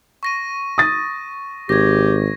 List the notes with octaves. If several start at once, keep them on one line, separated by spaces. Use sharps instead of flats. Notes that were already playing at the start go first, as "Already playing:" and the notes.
C#6 A#6 D#7
D#6 A6
G#1 G4 G#6 A#6